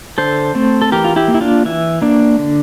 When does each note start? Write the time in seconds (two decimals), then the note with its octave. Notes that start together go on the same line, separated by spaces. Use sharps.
0.18 D3 A4 C5
0.55 A3 C4
0.82 A4
0.92 E3 G4 A#4
1.05 F4
1.16 E4 G4
1.28 A#3
1.34 E4
1.41 D4 F4
1.65 E3 E4
2.02 A#3 D4
2.39 D3